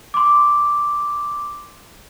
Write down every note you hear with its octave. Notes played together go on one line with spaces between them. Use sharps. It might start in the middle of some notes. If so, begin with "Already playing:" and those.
C6 D6